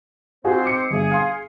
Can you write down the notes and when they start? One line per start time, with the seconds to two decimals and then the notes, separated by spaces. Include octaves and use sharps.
0.44 G#2 C4 F4 F#4 G#4 C5
0.65 D6 C#7
0.91 G1 G#4 E5
1.11 F5 C6